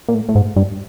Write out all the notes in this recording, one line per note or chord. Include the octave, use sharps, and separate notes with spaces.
A#2
A2
A2
G#2
G2